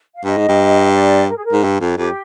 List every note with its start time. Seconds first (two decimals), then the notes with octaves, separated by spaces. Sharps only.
0.16 F5
0.25 G2 D#5
0.38 G#2
0.49 G2
0.94 D5
1.29 A#4
1.37 G#4
1.45 A#4
1.52 G#2
1.64 G2
1.81 F2
1.97 F2 G4